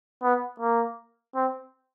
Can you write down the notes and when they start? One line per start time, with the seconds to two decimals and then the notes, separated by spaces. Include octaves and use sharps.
0.23 B3
0.60 A#3
1.36 C4